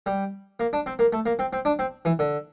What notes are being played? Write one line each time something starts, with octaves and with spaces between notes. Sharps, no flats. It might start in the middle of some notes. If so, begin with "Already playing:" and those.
G3
A#3
D4
C4
A#3
A3
A#3
C4
C4
D4
C4
E3
D3